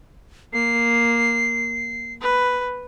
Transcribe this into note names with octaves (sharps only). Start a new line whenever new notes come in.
A#3 C7
B4